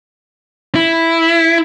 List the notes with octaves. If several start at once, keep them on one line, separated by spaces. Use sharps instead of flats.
E4